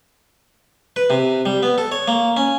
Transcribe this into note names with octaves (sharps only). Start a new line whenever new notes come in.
B4
C3
G3
B3
A4
C#5
A#3
C#4